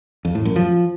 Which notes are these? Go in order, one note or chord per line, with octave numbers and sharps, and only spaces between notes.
F2
A2
F#2
F3